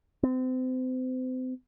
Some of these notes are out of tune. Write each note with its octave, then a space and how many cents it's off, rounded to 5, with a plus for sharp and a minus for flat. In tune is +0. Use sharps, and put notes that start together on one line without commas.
C4 -35